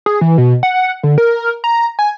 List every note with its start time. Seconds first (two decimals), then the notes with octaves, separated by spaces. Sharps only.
0.06 G#4
0.21 E3
0.38 B2
0.63 F#5
1.03 D3
1.18 A#4
1.64 A#5
1.99 G#5